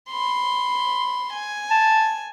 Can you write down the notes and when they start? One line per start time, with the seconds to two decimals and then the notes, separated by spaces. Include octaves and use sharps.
0.11 B5 C6
1.33 G#5
1.70 A5